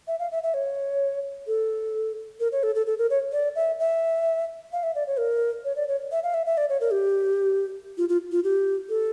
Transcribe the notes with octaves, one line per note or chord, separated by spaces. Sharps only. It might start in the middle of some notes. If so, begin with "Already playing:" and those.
E5
F5
E5
E5
C#5
A4
A#4
C#5
A4
A4
A4
A#4
C#5
D5
E5
E5
F5
E5
D5
C#5
A#4
C#5
D5
C#5
E5
F5
E5
E5
D5
C#5
A#4
G4
F4
F4
F4
G4
A4